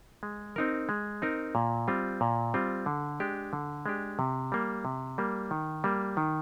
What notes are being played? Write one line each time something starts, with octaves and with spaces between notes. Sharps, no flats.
G#3
C4 D#4 A#4
G#3
C4 D#4 A#4
A#2
G3 C4 F4
A#2
G3 C4 F4
D3
G#3 D4 G4
D3
G#3 D4 G4
C3
G3 A#3
C3
G3 A#3
D#3
G3 A#3
D#3